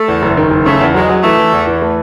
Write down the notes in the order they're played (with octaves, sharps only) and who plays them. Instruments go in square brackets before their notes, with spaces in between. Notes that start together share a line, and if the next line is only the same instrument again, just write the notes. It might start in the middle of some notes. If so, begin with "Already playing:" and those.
Already playing: [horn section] A3
[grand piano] E2
F#1
D#3
F#1
[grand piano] C#3 [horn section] A3
[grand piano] E2
[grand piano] F#3 [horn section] G#3
[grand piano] F#3
[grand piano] E3 [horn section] A3
[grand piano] E3
E2
E3
A3